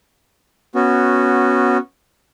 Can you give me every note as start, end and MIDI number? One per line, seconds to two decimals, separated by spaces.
0.75 1.77 59
0.75 1.77 61
0.75 1.77 66